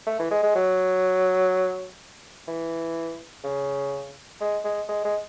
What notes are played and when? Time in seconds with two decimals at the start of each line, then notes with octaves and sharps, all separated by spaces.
0.07 A3
0.19 E3
0.31 G#3
0.43 G#3
0.55 F#3
2.48 E3
3.44 C#3
4.41 G#3
4.64 G#3
4.89 G#3
5.05 G#3